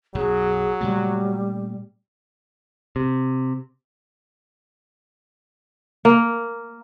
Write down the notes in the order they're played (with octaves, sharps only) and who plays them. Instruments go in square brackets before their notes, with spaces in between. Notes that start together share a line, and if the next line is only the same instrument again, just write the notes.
[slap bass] B1 F#2 [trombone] F#3 [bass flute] G#4
[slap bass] A#2 C#3 A3 [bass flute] G3
[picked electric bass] C3
[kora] A#3